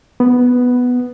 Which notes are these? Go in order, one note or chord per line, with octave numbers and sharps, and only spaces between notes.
B3